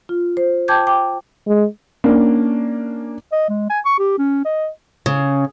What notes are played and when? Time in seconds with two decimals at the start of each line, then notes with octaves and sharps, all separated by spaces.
0.09 F4
0.37 C5
0.68 G5 A5 D6 G6 G#6
0.87 G5 D6
1.47 G#3
2.04 A#3 C#4 D4
3.32 D#5
3.49 G#3
3.70 G#5
3.85 C#6
3.99 G4
4.18 C#4
4.45 D#5
5.06 C#3